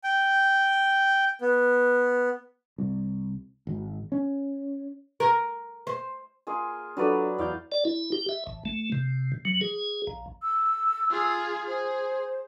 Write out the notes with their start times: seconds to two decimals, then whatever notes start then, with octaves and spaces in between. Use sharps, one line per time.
0.04 G5
1.41 B3
2.78 C2
3.67 G#1
4.12 C#4
5.20 A#4
5.87 C5
6.47 A#3 F4 G#4
6.97 F#3 D4 F4 A4 B4 D5
7.38 E2 E4 D5 F5 G6
7.72 D5
7.85 E4
8.12 G4
8.29 E5
8.47 A1
8.65 A3
8.92 C3
9.45 F#3
9.61 G#4
10.07 A#1
10.42 E6
11.10 F4 G#4
11.67 G#4 C5